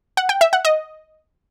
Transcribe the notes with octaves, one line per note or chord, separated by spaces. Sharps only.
F#5
G5
E5
F#5
D#5